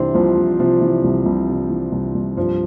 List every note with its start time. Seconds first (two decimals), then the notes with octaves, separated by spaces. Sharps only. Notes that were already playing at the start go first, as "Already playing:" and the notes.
Already playing: C2 C3 E3 C4 D4
0.15 C2 F3
0.37 C2
0.59 C3 F3
0.81 E3
1.04 C2
1.26 C2
1.48 C3
1.70 E3
1.92 C2
2.14 C2
2.37 G2 F3